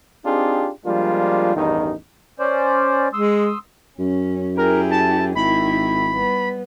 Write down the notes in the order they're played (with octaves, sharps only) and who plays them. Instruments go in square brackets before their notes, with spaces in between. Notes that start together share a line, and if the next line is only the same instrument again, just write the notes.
[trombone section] C4 D4 D#4 F4 G4 G#4
F3 G3 G#3 A#3 D4 F4
A1 E2 G2 D#3 D#4
[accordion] C#4 C5 D5
[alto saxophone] G#3 [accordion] C6 D#6 E6
[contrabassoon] F#2 [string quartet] C#4
[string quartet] E4 G4 G#4 [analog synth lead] A#4
[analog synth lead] A5
[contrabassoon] G#1 [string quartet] D#3 E4 [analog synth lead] B5
[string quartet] G3 B3